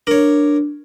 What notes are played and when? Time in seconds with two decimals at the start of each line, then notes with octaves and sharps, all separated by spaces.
0.07 D4 A#4 C#5